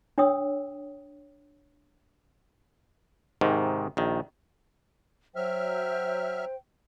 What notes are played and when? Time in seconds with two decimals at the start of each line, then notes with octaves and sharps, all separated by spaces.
0.18 D4 C#5 G5 D#6 E6
3.41 G#2 C3 D#3
3.97 A#1 D#3
5.36 F#3 C5 E5 G5 F6